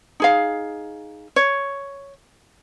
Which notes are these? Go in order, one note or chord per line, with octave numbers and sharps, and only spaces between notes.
D#4 G#4 F5
C#5